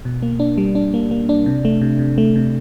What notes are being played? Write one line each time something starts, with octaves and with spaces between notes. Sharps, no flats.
B2
A#3
D4
G3
D4
A#3
A#3
D4
C3
A3
C3
C3
A3
C3